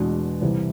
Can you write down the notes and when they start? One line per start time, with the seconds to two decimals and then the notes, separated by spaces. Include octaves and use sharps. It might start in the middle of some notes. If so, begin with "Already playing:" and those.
Already playing: E2 B2 G#3 D4
0.41 C2 C3 E3